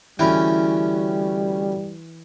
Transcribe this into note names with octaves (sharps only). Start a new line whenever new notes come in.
D2 E3 G3 C#4 E5 G5 B5